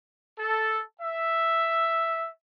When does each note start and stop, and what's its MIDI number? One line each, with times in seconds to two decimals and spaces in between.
0.39 0.80 69
1.01 2.28 76